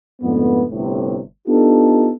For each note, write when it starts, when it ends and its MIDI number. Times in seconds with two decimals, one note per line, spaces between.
0.22 0.65 41
0.22 0.65 44
0.22 0.65 50
0.22 0.65 57
0.22 0.65 59
0.71 1.20 31
0.71 1.20 45
0.71 1.20 48
1.48 2.11 59
1.48 2.11 62
1.48 2.11 63
1.48 2.11 65
1.48 2.11 67
1.48 2.11 69